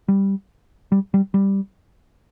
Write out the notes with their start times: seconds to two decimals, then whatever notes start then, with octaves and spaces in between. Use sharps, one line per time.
0.08 G3
0.92 G3
1.14 G3
1.34 G3